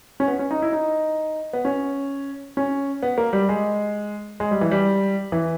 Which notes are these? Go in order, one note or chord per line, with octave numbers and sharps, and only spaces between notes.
C#4
B3
C#4
D#4
E4
D#4
B3
C#4
C#4
B3
A#3
G3
G#3
G#3
G3
E3
G3
E3